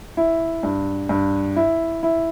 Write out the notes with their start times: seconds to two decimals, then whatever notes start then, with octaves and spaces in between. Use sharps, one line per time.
0.17 E4
0.63 G2
1.09 G2
1.56 E4
2.03 E4